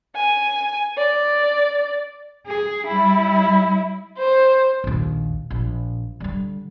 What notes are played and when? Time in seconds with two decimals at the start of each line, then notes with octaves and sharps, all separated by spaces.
0.15 G#5
0.98 D5
2.47 G#4
2.87 G3 E4
4.18 C5
4.84 A#1 D#2
5.50 A#1
6.20 D3 G3